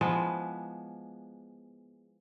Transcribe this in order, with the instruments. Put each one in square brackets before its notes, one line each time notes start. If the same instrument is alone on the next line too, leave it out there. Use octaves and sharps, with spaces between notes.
[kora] E3 F3 G#3 B3